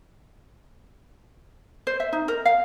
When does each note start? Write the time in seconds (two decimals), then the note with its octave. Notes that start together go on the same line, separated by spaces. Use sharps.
1.87 C5
2.00 E5
2.13 D#4
2.28 A#4
2.45 F5